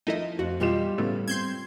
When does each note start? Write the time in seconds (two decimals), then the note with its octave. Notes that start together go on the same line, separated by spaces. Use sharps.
0.07 F3 A3 D#4 E4 D#5
0.39 F2 F#4
0.60 B2 E3 G3 F4 G4 D#5 E7
0.98 A2 C#3 A3 B3
1.28 C4 C6 G6 G#6